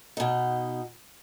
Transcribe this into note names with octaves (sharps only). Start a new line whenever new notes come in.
B2 D#4